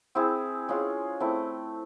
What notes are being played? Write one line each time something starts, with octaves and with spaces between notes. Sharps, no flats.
C4 E4 G#4
G#3 C#4 F4 G#4
A3 C4 E4